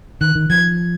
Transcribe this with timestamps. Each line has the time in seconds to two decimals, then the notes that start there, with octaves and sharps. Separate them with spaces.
0.21 D#3 F#6
0.35 D#3
0.49 F3 G#6